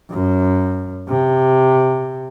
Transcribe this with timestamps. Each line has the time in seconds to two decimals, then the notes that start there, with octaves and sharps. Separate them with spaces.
0.11 F#2
1.09 C3